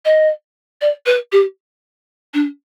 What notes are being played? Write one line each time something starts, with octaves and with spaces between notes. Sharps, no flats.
D#5
D5
B4
G4
D4